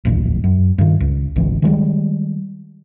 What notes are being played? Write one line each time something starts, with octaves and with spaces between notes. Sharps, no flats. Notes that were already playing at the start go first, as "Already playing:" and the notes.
D1 A#1 E2
F#2
G2 D#3
C#2
G#1 C#2 E3
D#3 E3 G3 G#3